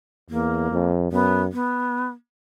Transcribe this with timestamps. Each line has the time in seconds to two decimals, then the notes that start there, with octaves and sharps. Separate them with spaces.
0.30 E2 A#3
0.71 F2
1.11 F#2 B3
1.52 B3